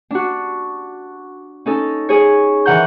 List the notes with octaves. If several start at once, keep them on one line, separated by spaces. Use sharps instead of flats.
D4 F#4
C#4 D#4 A4
G#4 C#5
D#3 E3 F#5 A#5 G6